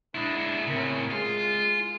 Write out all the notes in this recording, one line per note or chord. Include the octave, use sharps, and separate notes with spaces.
G#3 D4 E4
A2 C#3 C4 A#4
G#3 F4 G#4